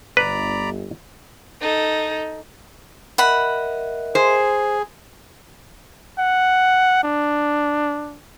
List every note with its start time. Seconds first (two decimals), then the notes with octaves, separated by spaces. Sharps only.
0.17 G1 B4 D5 A#5 B5
1.61 D#4 A4
3.18 A#4 D#5 E5 F#5 B5
4.15 G#4 C5
6.19 F#5
7.04 D4